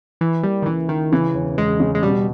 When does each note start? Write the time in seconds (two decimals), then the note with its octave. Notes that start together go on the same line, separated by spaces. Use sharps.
0.21 E3 E4
0.43 G3 A#3
0.62 D#3
0.66 C#2 E3
0.89 D#3 E4
1.12 C#3 E3
1.34 E1
1.58 E2 G#3
1.80 C#3
1.95 G#3
2.02 B2 G3